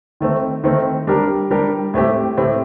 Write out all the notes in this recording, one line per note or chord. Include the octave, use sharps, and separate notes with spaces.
D#3 A3 C4
D#3 A3 C4
G3 D4 G4 A#4
G3 D4 G4 A#4
A2 A3 C4 G4
A2 A3 C4 G4